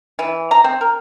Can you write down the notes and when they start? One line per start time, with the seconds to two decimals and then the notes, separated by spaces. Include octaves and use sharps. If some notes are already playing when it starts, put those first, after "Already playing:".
0.19 E3
0.51 A#5
0.64 C4
0.81 A#4